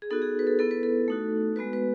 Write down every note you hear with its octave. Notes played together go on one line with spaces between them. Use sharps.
G#4
B3 D#4 F#4 A4
G#4
B4
A4
B3 E4 A4
B4
A4
A3 D#4 F#4
G#3 B3 F#4 B4
B4